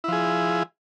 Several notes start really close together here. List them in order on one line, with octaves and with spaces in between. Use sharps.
E4 F3 G#4